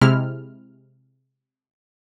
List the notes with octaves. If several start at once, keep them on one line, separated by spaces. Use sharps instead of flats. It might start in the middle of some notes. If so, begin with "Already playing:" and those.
C3 G#3 E4 F6